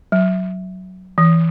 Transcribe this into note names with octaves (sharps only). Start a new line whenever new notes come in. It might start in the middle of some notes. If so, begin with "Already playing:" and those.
F#3
E3